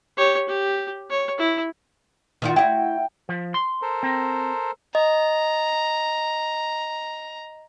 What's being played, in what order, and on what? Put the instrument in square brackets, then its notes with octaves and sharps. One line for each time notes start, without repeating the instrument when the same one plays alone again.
[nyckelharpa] G4 C#5
G4
C#5
E4
[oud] D#3 F4 F#4
[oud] E4 F#4 [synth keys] G5
[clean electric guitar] F3
C6
[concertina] A4 A#4 C5
[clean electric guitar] C4
[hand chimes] D#5 [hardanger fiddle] A#5